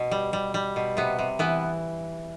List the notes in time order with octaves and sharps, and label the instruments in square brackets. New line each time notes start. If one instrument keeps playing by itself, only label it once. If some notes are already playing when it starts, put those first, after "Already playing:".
Already playing: [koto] B2
G3
G3
G3
B2
C3 B3
C3
E3 B3